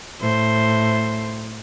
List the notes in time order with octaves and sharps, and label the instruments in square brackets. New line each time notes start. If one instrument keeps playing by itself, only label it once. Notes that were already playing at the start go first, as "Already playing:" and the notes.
[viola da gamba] A2 C5